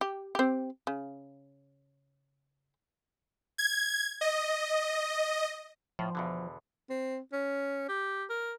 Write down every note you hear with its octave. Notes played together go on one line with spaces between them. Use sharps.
G4
C4 G4
C#3
G#6
D#5
A2 F3
E2 B2 D3
C4
C#4
G4
A#4